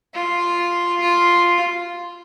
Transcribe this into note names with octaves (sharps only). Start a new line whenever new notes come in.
F4
F4